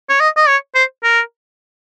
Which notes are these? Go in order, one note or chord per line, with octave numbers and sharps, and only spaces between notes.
C#5
D#5
D#5
C#5
C5
A#4